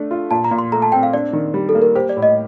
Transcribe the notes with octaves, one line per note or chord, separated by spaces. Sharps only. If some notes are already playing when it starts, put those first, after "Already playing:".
Already playing: A3 D4
F4
A#2 A5
A#5
A#2
C6
A3 A#5
A5
C4 G5
F5
D4 D5
D#3
G3
A4
A#3
A#4
G4 C5
D5
A2
D#5